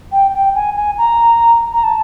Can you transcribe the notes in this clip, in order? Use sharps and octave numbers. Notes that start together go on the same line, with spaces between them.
G5
G5
G#5
G#5
A#5
A#5
A5